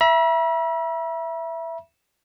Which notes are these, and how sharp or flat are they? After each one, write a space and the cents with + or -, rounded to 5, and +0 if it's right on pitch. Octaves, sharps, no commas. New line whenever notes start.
E5 +10 B5 -45